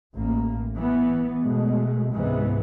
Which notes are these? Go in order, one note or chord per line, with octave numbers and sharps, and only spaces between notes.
A1 A#3
E3 B3
B2 G#3 A3
C#2 G#2 C3 E3 G#3 B3